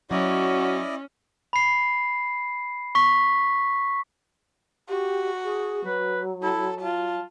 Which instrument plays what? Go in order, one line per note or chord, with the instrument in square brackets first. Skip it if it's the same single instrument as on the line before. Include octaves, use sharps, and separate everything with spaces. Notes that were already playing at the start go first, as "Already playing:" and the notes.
[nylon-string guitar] F#3 [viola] C#4 [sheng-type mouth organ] E4 D5 D#5 [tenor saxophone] F#4
[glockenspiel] B5 C7
C#6 B6
[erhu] F#4 [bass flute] G4
[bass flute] G#4
[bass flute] F#3 [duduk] B4
[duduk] E4 [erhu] A4
[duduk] F4 [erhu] A5